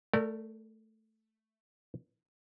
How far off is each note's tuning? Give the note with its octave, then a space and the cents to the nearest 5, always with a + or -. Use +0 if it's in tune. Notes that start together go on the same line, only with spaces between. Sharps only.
A3 +0 A#4 -30 D5 +0